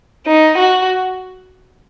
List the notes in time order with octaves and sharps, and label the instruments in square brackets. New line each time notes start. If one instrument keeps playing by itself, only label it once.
[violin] D#4
F#4